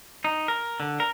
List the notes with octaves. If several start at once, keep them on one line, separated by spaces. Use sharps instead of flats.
D#4
A#4
D3
A#4